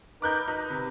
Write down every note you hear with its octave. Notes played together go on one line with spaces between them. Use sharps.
D#4 A#4 B4 D6 F#6 G6
D#4 B4
C3